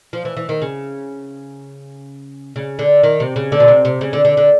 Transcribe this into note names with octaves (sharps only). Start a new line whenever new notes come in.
F3
E3
E3
D#3
C#3
C#3
D3
D#3
C3
C#3
D3
B2
C3
C3
C#3
D3
D3
D3